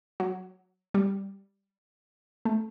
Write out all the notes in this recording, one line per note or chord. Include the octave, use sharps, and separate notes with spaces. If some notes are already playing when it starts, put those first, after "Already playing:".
F#3
G3
A3